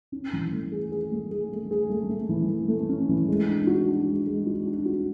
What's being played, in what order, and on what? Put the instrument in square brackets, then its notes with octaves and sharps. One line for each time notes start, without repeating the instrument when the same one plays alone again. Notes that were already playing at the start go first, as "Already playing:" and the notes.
[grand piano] C#4
E3
A3
G#4
G#4
A3
G#4
A3
G#4
A3
A3
E3
A3
A3
C#4
E3
G#3
D4
F#4
D4
G#3
G#3
F#4
D4
F#4